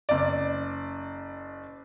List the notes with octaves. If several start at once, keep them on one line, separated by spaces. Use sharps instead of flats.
F#1 D5